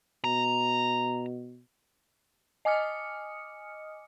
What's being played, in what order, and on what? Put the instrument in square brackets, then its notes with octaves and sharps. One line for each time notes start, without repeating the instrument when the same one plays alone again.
[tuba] B2 [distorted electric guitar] A#5
[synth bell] D#5 G#5 D6 D#6 F6 C#7